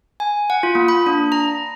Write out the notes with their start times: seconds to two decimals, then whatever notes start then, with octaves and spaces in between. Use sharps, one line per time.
0.20 G#5
0.50 F#5
0.63 F4
0.75 A#3
0.88 B5
1.06 D4
1.32 A#5